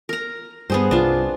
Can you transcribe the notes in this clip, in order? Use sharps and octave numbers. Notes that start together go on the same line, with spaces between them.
A#4 A#5
G2 B3 G#4 C5
C2 D4 F4